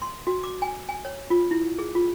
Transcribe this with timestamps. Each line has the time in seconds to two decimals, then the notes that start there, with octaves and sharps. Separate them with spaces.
0.02 C6
0.27 F#4
0.43 D6
0.62 G#5
0.89 G#5
1.05 C#5
1.30 F4
1.51 E4
1.78 G#4
1.95 F4